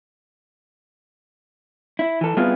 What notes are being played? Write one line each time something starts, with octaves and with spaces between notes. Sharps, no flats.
E4
E3 A4
G3 B3 C4 E4 F4 G#4